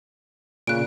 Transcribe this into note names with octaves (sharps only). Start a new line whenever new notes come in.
A#2 C#3 F#6 D7